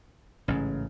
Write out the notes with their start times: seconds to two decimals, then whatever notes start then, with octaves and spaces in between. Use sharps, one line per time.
0.48 A1 G#2 C#3